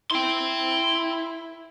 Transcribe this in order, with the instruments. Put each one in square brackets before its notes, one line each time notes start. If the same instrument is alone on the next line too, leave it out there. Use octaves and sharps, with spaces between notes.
[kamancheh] E4 [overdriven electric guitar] G5 C6